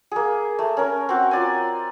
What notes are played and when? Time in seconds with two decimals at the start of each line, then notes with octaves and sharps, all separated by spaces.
0.11 A#3 G#4
0.59 A3
0.77 C#4 A#4
1.09 C4 F#4
1.31 F4 D5 G#5